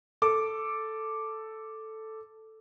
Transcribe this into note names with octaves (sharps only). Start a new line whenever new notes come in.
A4 D6